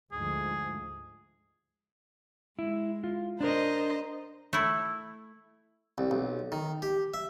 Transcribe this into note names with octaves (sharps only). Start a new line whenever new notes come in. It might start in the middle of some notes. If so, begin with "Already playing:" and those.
D2 G#2 F3 G#4
G#3 E4
F4
D4 A#4 C5 D#5 A#5
A3 E4
C2
B1
D#3
G4
E5